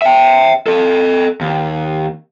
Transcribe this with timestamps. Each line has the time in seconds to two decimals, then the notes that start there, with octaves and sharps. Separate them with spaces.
0.02 E5 G5
0.66 A4 D#5
1.41 D#2